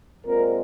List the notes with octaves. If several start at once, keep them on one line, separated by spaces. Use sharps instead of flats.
A#2 G#3 C4 A#4